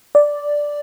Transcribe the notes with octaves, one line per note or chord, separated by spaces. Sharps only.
D5